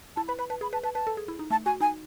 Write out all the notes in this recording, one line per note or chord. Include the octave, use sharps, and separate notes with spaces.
E4 A5
B4 B5
B4 B5
B4 A5
G#4 B5
B4 A5
B4 A5
B4 A5
A4
G#4
E4
D#4
A3 A5
F#4 G#5
D#4 G#5